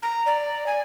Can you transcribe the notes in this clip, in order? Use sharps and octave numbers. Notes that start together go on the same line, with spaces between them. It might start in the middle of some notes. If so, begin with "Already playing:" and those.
A#5
D5
G#5